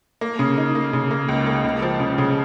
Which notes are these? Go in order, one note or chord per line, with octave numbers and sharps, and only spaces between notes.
A#3
C#3
D#4
A#3
C#3
A#3
C#2
A#3
C#2
F3
C#3
C#3